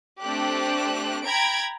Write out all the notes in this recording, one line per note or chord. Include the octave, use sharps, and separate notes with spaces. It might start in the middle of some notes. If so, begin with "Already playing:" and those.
A3 C4 D4 G4 F#6
G5 A#5 B5 G#6 D7